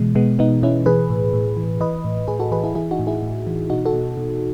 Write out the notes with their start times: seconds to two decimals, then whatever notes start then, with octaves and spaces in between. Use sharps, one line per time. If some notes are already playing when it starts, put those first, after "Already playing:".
Already playing: B2 E3 G#3
0.15 B2 G#3 B3
0.39 B2 B3 D#4
0.63 B2 C#4 E4
0.86 E3 G#4 B4
1.10 A2
1.33 A2
1.57 E3
1.80 E3 B4 D#5
2.05 A2
2.28 A2 G#4 B4
2.40 F#4 A4
2.52 E3 G#4 B4
2.64 E4 G#4
2.75 E3 E4 G#4
2.91 D#4 F#4
2.99 A2
3.07 E4 G#4
3.23 A2
3.47 E3
3.70 B2 D#4 F#4
3.86 F#4 A4
3.93 B2
4.17 B2